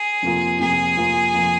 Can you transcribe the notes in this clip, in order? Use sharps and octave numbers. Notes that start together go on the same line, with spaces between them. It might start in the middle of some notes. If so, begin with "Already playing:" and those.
Already playing: G#4
F2 C3 F3 A#3 F4
F2 C3 F3 A#3 F4 G#4
F2 C3 F3 A#3 F4
F2 C3 F3 A#3 F4